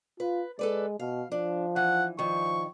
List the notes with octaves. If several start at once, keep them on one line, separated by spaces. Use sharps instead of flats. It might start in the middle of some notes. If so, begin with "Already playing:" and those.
F4 B4
G#3 A4 B4 D5
B2 F5
F3 D4
E3 F#5
G2 D#3 F3 C#6